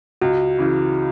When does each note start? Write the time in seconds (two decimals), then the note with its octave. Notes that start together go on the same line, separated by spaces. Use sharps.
0.22 C#2 F#4
0.59 C#3 E3